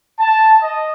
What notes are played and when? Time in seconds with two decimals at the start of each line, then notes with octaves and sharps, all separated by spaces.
0.19 A5
0.62 D#5